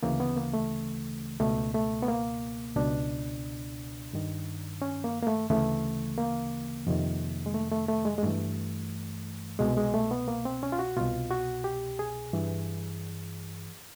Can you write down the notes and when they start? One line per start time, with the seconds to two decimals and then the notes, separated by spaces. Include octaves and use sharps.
0.03 D2 C#3 E3 A#3
0.20 B3
0.37 A#3
0.53 A3
1.40 C#2 B2 A3
1.74 A3
2.03 B3
2.08 A#3
2.76 C#2 B2 D4
4.13 G2 D#3
4.82 C#4
5.04 A#3
5.22 A#3
5.27 A3
5.50 D2 C#3 E3 A3
6.18 A#3
6.87 F2 C3 D#3
7.46 G#3
7.54 A3
7.71 A3
7.89 A3
8.05 G#3
8.18 G#3
8.22 G2 E3 A3
9.59 C2 B2 G#3
9.77 G#3
9.94 A3
10.11 B3
10.28 A#3
10.45 C4
10.63 C#4
10.72 F4
10.79 F#4
10.96 C2 B2 F4
11.30 F#4
11.64 G4
11.99 G#4
12.33 G2 E3